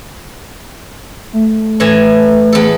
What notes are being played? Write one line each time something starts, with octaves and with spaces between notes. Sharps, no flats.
A3
A2 E3 G#5
E2 A4